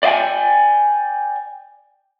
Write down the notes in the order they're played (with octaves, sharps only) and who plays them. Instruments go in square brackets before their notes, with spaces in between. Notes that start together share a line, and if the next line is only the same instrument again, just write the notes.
[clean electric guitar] D5 D#5 F5 G5 G#5